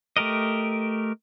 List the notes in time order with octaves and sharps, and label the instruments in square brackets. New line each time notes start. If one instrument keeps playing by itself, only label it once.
[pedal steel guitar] A3 G4 A#4 D#5